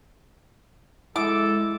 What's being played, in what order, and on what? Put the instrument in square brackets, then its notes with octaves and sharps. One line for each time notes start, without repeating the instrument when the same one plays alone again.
[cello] G#3 [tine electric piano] E4 [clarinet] A4 [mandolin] D6